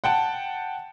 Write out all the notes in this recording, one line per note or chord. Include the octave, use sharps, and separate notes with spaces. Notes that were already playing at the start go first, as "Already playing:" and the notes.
F#5 G5 A5